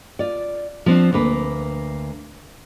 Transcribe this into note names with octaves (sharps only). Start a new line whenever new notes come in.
F4 D5
F3 C4 D4
D2 A#3 B4